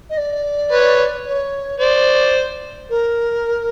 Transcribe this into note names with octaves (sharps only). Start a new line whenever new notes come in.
D#5
D5
B4 C#5
C#5
C5 D5
A#4